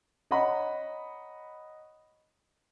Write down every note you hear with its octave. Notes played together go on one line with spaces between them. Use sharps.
C#5 D#5 F#5 A#5 B5